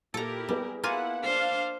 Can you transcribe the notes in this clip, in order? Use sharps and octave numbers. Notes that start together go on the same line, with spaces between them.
A#2 E4 G4 A4 A#4 A#5
G3 B3 G#4 B4
A#3 E4 F4 F#5 G#5
D4 C5 F5